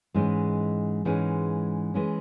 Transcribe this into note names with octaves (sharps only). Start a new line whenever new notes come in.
G#2 E3 G#3 C#4
G#2 E3 G#3 C#4
E3 G#3 C#4